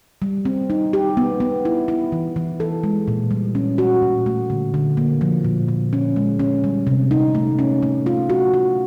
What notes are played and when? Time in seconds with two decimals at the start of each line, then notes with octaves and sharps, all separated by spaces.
0.22 G3
0.45 C4
0.70 D#4
0.93 G4
1.17 B3
1.40 B3
1.65 E4
1.88 E4
2.12 E3
2.36 E3
2.60 A4
2.84 G#3
3.08 A#2
3.31 G3
3.55 C#4
3.78 F#4
4.02 A#2
4.26 A3
4.50 D3
4.74 D3
4.97 A#3
5.21 F3
5.45 A#2
5.68 A#2
5.93 C#4
6.16 G#3
6.39 C#4
6.64 G3
6.87 C3
7.11 D#4
7.35 A3
7.59 C#4
7.83 A3
8.06 F4
8.30 F#4
8.54 F#4